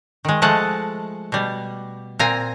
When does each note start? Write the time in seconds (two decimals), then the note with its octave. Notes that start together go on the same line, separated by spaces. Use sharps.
0.25 D#3 G#3
0.42 F3 G#3 A3 F#5 A5
1.32 B2 G3
2.19 A#2 C4 F5 G#5 A#5